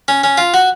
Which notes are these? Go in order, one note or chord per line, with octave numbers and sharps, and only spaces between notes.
C#4
C#4
F4
F#4